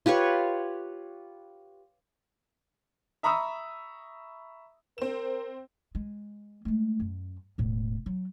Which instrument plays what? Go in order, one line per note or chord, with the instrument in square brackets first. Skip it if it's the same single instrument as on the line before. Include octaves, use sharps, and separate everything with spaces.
[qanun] F4 G4 B4 C#5
[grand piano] E5 A#5 B5 C#6 D#6 E6
[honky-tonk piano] C4 E7 [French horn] A#4
[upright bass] G#3
G#3 A3
F#2
E1 A2
F#3